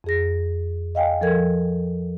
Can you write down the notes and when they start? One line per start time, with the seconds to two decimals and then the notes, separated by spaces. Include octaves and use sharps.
0.04 F2 G#4 A#6
0.95 D#5 F5 G5 G#5
1.21 F3 A4 A#4 G#6